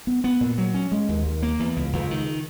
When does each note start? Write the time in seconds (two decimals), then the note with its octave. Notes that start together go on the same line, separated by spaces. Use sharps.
0.07 B3
0.24 B3
0.41 A#2
0.58 F#3
0.74 C#4
0.92 G#3
1.08 D#2
1.25 D#2
1.43 A#3
1.60 E2
1.76 C#2
1.93 C#2
2.11 D#3